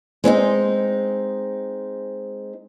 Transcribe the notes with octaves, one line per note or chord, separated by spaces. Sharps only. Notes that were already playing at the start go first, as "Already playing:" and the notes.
G#3 C4 C#4 D#4